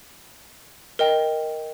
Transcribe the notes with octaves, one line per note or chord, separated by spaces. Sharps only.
A#4 D#5 G5